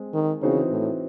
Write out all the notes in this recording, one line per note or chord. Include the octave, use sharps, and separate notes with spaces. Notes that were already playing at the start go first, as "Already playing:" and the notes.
Already playing: G#3 C4
D#3
C#3 E3 C4 D#4 F#4 C5
A2